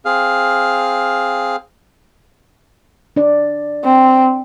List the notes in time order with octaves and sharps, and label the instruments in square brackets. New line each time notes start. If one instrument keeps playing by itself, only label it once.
[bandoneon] C4 G#4 F5 F6
[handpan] D4 D5
[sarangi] C4